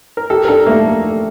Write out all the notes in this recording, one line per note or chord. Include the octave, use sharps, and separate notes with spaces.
A#4
G4 A4
A#4
D4 A4
A3 A#3